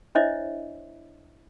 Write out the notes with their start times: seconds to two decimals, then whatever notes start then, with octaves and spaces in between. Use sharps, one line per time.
0.15 D4 E4 C5 C#5 D#5 E5